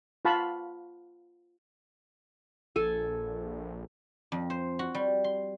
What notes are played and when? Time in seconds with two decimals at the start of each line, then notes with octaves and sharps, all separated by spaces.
0.25 F4 F5 F#5 A5 B5 C#6
2.76 A#1 A4 G#5
4.32 F2
4.50 C5
4.79 F#4
4.95 G3
5.24 C6